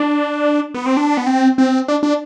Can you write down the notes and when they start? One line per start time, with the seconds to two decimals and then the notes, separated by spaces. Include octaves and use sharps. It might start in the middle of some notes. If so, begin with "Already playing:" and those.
Already playing: D4
0.74 B3
0.86 C4
0.97 D4
1.17 B3
1.26 C4
1.58 C4
1.88 D4
2.03 D4